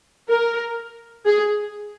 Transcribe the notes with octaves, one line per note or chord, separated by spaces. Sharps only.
A#4
G#4